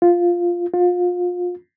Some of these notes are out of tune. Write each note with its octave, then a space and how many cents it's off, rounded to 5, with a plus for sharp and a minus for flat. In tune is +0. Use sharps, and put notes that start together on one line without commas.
F4 +0
F4 +30